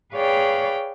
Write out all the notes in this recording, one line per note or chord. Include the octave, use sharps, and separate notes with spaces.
G#4 B4 C#5 D5 F5 G5